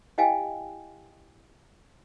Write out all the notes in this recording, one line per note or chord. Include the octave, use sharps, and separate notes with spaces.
E4 G4 D#5 F5 G5 G#5